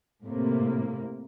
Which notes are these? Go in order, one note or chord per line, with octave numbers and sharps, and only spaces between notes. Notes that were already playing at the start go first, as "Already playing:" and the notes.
A2 C3 A#3